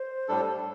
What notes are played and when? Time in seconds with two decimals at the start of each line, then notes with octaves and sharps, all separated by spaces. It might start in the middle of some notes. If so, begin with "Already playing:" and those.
Already playing: C5
0.28 A2 G3 D4 A4